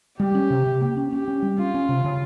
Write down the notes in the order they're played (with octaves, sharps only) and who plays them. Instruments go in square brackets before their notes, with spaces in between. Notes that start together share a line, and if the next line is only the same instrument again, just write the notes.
[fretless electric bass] G3 [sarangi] G4
[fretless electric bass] C#4
C3
C3
A#3
C#4
[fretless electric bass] C#4 [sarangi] G4
[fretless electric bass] C#4
G3
[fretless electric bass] C#4 [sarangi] F4
[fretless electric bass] C#4
C3
C#3